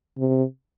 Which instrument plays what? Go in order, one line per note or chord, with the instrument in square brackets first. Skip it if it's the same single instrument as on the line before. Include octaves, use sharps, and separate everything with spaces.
[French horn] C3